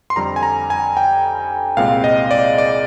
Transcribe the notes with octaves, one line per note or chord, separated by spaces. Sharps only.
C6
F2 D3 G3 A#5
G#5
A#5
G#5
G5
C2 A#2 G#3 C4 F5
D#5
D5
D5